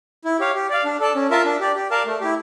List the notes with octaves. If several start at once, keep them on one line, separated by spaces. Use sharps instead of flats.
E4
G4 C#5 F5
G4
D5 F5
D4
A4 D5 A5
C#4
F4 A#4 E5 A5
D4
G4 D5
G4
A#4 D5 F5 A5
A3
E4 G4